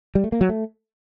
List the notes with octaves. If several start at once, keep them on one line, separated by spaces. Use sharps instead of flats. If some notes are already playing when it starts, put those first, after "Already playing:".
G3
A3
A#3
F#3
A3